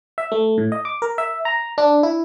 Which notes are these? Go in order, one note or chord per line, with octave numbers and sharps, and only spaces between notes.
E5
A3
A2
D#5
D6
A#4
E5
A#5
D4
E4